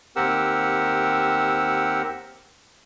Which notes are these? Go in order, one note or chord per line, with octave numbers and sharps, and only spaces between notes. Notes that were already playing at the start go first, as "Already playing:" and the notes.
D#2 C4 G4 A#4 F#5 E6